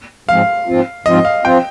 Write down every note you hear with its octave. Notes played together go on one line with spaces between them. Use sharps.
G#2 F3 G#3 C4 F5
G#2 F3 C4 F4
G#2 F3 C4 F4 D#5
F5
F3 C4 F4 G5